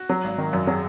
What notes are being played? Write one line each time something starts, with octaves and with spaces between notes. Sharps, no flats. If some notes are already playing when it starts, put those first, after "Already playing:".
Already playing: F#4
F#3
G#1
D#3
F#2
F#3 G#4